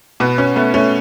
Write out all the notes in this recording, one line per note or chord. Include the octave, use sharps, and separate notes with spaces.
B2 B3
B2 C#4
A3 B3
A3 C#4